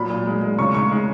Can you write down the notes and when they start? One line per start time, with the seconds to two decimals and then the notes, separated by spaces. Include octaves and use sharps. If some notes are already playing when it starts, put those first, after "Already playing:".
Already playing: A#2 F#3 B5
0.10 A#2
0.26 G#3
0.42 G#3
0.58 C#3 C#6
0.74 G#3 C#6
0.91 G#3